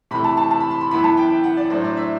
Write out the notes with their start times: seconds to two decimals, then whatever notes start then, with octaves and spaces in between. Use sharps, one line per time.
0.11 C3 E3 A3 B5
0.24 A5
0.37 A5
0.51 A5
0.60 B5
0.71 C6
0.81 B5
0.91 F#2 E3 B3 E4 B5
1.04 A5
1.17 G5
1.31 G5
1.44 F#5
1.57 D5
1.70 A2 F#3 A3 D4 C5
1.84 D5
1.97 E5